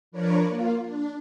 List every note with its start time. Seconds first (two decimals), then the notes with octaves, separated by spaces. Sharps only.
0.12 F3 D4 A#4 B4 C#5 D5
0.46 A#3 F4
0.83 D4